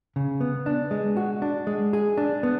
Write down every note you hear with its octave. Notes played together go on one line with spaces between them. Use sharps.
C#3
B3
D4
G#3
F#4
D4
G#3
G#4
D4
B3